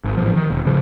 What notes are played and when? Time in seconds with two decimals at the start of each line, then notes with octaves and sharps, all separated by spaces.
0.04 G#1
0.17 A2 C#3 E3 F3
0.34 D#3
0.50 E1
0.66 A1 C#3 F3